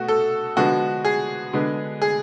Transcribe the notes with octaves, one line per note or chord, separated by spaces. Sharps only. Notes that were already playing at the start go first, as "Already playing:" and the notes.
Already playing: B2 A3 F#4
A4
D3 F3 G#3 B3 F#4
G#4
D3 G#3 B3
G#4